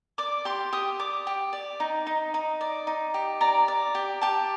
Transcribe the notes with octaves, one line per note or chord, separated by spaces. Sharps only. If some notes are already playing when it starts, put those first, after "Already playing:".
D5 D6
G4 C6
G4 D#6
D5 D6
G4
D5
D#4
D#4
D#4
D5
D#4
G4
D5 A#5
D5
G4
G4 A5